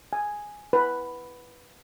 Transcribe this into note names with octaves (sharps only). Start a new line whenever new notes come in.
G#5
B4